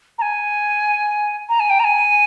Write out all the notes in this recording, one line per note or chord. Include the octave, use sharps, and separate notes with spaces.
A#5
G#5
A#5
G#5
G5
A#5
G#5